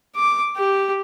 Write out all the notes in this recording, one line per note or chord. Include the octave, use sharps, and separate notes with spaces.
D6
G4